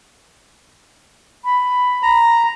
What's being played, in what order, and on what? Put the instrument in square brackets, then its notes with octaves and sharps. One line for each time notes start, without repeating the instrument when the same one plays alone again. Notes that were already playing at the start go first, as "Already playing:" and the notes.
[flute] B5
[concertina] A#5